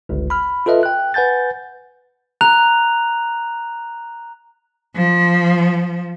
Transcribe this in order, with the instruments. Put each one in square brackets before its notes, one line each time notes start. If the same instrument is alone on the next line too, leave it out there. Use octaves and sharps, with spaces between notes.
[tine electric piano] G1 C#2
B5 F6
F4 A4 B4 D#5 E5
G5 F#6
B4 F#5 G#5 G6 A6
[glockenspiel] A#5 F#6 F7
[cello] F3